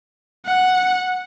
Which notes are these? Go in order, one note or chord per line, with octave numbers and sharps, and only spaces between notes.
F#5